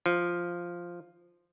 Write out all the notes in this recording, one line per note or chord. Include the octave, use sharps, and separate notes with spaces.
F3